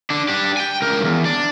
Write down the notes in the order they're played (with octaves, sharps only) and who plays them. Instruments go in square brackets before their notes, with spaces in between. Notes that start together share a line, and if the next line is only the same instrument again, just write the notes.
[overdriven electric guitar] D3 D4
D4 G4
G5 G#5
C#2 A#4
E2 G2
D4